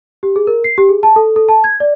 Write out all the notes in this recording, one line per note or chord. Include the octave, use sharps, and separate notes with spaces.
G4
G#4
A#4
C7
G4
G#4
A5
A4
A4
A5
G#6
D5